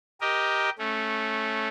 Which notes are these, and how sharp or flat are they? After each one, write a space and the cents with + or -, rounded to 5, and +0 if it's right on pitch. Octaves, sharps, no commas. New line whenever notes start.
G4 +0 A#4 +15 D#5 +0
A3 -10 C#4 -15